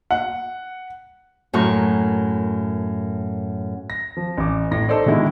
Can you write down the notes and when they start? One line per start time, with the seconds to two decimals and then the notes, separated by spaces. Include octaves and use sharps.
0.11 F#5
1.53 F#2 A2 A#4 C#6
3.90 A#6
4.17 F3
4.37 A1 D6
4.71 A2 A#6
4.88 D#4 A4 C5 D5 D#5
5.06 B2 D3 D#3 G#3 E4